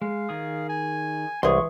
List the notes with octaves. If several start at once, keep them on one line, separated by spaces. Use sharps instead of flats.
G#3 F5
D#3 G#4 D#6
G#5
C2 E3 G#3 G#4 C6 C#6